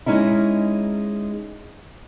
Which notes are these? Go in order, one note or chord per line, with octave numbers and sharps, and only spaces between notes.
G#3 C#4 D#4 E4